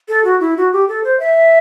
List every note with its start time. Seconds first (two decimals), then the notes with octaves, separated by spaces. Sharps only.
0.08 A4
0.24 F#4
0.40 E4
0.57 F#4
0.73 G4
0.88 A4
1.04 C5
1.19 E5